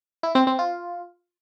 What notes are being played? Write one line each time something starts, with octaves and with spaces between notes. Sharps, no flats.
E4
C4
C4
F4